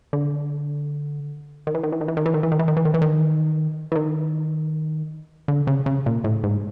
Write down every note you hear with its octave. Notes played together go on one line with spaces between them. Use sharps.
D3
D#3
E3
D#3
E3
D#3
E3
D#3
E3
D#3
E3
D#3
E3
D#3
E3
D#3
E3
D#3
E3
D#3
D3
C#3
C#3
A#2
A2
G#2